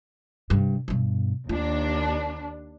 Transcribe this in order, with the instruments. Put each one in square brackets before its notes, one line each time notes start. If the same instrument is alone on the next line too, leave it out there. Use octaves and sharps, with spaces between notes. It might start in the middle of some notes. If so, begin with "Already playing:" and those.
[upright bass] G2 C3
G2 B2
[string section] D#2 D4 [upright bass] F4